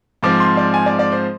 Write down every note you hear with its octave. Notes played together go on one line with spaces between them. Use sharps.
G#2 F3 C4 D6
C6
D5
G#5
D5
D5
C5